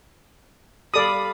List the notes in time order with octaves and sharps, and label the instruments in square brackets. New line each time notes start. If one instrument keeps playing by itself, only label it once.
[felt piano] G3 A4 [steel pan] D5 D#6 [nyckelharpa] F5 B5